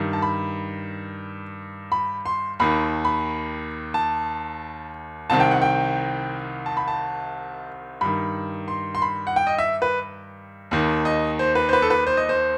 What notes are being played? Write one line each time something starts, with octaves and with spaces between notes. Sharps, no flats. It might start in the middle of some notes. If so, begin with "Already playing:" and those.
Already playing: G2 D#3
A5
B5
B5
C6
D#2 D#3 B5
B5
A5
C2 C3 D#3 A5
G5
F#5
G5
A5
B5
A5
G2 D#3 B5
C6
C6
B5
F#5
G5
D#5
E5
B4
D#2 D#3
D#5
C5
B4
C5
B4
A4
B4
C5
D#5
C5